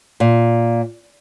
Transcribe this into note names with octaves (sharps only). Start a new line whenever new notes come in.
A#2